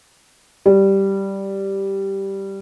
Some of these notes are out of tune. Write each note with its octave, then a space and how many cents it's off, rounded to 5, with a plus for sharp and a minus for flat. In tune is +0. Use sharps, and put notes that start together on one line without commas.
G3 -5